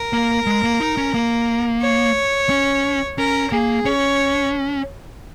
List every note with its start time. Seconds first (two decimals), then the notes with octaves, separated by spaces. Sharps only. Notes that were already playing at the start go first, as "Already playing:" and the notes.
Already playing: A#4
0.13 A#3
0.46 G#3
0.64 A#3
0.81 D#4
0.97 C#4
1.14 A#3
1.82 C#5
2.50 C#4
3.18 C#4 A#4
3.52 A#3 G#4
3.85 C#4 C#5